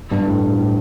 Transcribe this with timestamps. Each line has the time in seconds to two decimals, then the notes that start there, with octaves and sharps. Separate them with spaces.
0.11 G2
0.26 A2
0.40 A2
0.55 A2